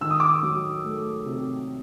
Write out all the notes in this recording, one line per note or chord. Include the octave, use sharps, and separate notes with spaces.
D#3 E6
D#6
D6
D#6
F#3
A3
C3